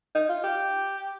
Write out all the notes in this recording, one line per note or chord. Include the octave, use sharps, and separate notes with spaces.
D#4
F4
G4